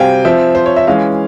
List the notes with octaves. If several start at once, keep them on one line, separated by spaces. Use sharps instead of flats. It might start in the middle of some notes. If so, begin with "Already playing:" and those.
Already playing: C3 G3 C4 F5 G5 G#5
F3 C4 E5
C5
C#5
E5
E3 G#3 C#4 F5